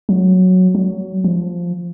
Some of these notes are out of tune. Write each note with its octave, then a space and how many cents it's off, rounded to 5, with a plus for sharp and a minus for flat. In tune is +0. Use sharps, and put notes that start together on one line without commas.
F#3 -5
F#3 +25
F3 +0